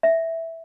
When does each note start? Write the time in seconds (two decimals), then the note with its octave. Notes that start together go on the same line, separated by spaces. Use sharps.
0.03 E5